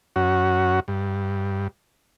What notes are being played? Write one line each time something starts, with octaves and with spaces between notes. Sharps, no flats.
F#2 C#4 F#4
G2